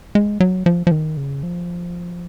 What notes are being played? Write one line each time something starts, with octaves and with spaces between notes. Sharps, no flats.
G#3
F#3
F3
F3
D#3
C#3
F3